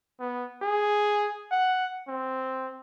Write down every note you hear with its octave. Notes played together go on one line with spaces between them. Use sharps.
B3
G#4
F#5
C4